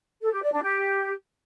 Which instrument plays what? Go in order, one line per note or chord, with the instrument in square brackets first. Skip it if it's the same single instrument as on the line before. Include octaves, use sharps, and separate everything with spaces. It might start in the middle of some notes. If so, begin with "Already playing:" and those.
[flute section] A4
G4
D5
D4
G4